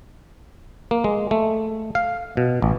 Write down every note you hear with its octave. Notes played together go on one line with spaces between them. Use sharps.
A#3
G#3
A3
F5
B2
A1